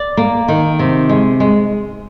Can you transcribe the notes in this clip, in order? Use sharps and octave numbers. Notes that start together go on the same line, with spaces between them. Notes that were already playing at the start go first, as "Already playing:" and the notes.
Already playing: D5
A#3
D#3
C3
G#3
G#3